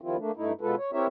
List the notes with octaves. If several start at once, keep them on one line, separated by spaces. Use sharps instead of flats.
D#3 F3 G3 C4 E4 F4
A3 A#3 D4
G2 A3 D#4 E4
B2 G#3 B3 F4 A4 B4
C#5
C4 E4 G4 A#4 C#5 E5